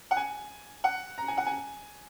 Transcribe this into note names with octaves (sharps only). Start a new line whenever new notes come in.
F#5
G#5
F#5
A#5
G#5
F#5
G#5